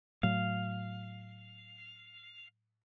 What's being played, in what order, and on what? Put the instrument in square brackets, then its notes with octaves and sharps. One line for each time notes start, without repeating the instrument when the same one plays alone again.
[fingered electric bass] A2 F#3 [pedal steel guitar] F5